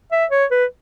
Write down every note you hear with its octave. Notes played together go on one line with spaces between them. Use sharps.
E5
C#5
B4